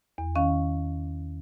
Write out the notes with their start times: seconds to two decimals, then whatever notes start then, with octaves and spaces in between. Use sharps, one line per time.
0.18 E2
0.36 D#3 C#4 F5